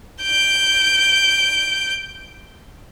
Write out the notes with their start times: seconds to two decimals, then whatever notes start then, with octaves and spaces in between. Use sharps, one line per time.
0.23 G6 D7